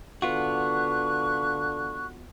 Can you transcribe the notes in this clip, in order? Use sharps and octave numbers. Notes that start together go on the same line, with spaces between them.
D3 B3 F4 F#4 C#6 F#6